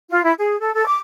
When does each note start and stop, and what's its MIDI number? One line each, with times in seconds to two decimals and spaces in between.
0.10 0.23 65
0.24 0.33 64
0.39 0.59 68
0.60 0.71 69
0.74 0.87 69
0.87 0.98 86